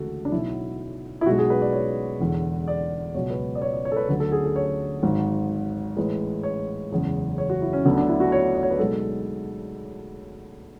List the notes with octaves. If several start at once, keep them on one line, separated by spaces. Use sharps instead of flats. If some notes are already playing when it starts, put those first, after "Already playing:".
Already playing: D2 C#3 E3 G#3 F#4 A4
D4
B1 B2 F#3 E4
E4
B1 B2 G#3 F#4
G#4
B4
D5
C#5
E1 E2 D3
D5
C#2 B2 F#3 C#5
B4
D5
C#5
D5
C#5
A4
B4
D2 D3 F#3 A4
A4
G#4
A4
C#5
G#1 G#2 F#3
A1 A2 G#3 B4
C#5
F#1 E2 C#3 G#3
C#5
F#4
E4
C#4
D2 D3 F#3 B3
D4
E4
F#4
C#5
D5
C#5
B4
B1 B2 G#3 A4